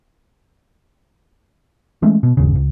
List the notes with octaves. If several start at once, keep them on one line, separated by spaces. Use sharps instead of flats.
E3 G#3 A3 C#4
B2
G1 D#2 C#3
C#2